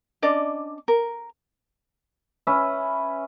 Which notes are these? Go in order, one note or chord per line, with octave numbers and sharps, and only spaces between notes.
C#4 D4 D5 D#5
A#4
C#4 B4 E5